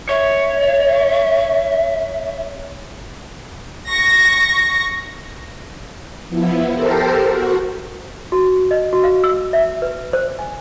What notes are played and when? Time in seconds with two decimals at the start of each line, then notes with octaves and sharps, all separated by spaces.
0.09 C#5 E5
3.89 C#6 A#6
6.29 F3 B3 E4
6.73 G4 A4 A#4 C5
7.27 F#4
8.32 F#4
8.71 D#5
8.93 F#4
9.04 F5
9.24 E6
9.53 E5
9.82 B4
10.13 C5
10.39 G#5